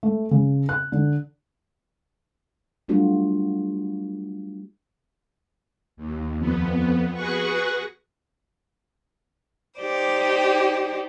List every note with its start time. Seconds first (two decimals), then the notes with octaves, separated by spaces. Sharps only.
0.03 A3
0.31 C#3
0.69 F#6
0.92 D3
2.88 F#3 G3 A3 D4 F4 F#4
5.97 D#2
6.37 F2 B3
7.14 F#4 G#4 B4 F#5 C#6
9.78 D#4 G4 C5 D5